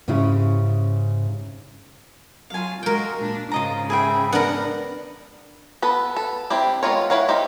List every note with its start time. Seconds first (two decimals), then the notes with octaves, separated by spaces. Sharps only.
0.08 G#2 C#3 C#4 E4 G4
2.50 F#3 F4 F5 G#5
2.83 G#3 F#4 A#4 G5
3.20 A#2 D4
3.52 G#2 C#3 F4 D#5 A#5
3.90 G#4 E5 G5 B5
4.33 B3 D4 A#4 F#5 G5 A#5
5.82 B3 A4 B4
6.17 A4
6.50 C4 D4 E4 G4
6.83 G#3 B3 F4 A#4 C#5
7.10 E4 B4 C#5 F5 F#5
7.28 D#4 G4 C5 E5